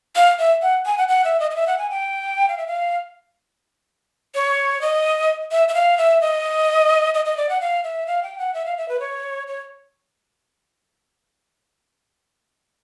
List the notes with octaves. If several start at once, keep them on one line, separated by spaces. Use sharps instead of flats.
F5
E5
F#5
G#5
F#5
F#5
E5
D#5
D#5
E5
F#5
G#5
G5
F5
E5
F5
C#5
D#5
E5
E5
F5
E5
D#5
D#5
D#5
D5
F#5
F5
E5
F5
G5
F#5
E5
F5
E5
B4
C#5
C#5